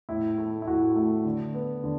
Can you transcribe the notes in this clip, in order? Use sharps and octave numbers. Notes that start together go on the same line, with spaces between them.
A2 E4
A3
E4
A2 F#4
A3
D3
B3
D3